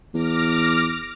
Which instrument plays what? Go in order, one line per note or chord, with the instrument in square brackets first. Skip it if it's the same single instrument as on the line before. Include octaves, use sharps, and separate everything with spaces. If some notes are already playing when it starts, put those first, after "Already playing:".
[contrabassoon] E2 [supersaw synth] D6 F6 A#6